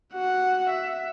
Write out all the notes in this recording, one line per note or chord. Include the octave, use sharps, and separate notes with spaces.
F#4 F#5
E5